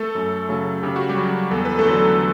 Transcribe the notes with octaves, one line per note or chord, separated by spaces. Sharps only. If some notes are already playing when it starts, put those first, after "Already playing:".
Already playing: A3 A4
F#2
C#3 F#3 A3
C#3 G4
F#4
G3 G4
F#3 C#4
E2 A4
B4
A3 A4
D3 F#3